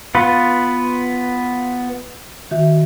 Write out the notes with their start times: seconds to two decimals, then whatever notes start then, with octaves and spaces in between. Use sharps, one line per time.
0.15 B3 F4 B4
2.51 D#3 F#4 E5